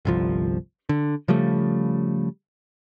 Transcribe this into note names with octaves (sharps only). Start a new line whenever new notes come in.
G1 C2 F3
D3
C#3 F3 G3 A3